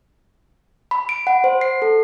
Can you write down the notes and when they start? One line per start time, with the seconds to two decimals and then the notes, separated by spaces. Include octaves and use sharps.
0.91 B5
1.09 D7
1.27 F#5
1.44 C5
1.61 C7
1.82 A4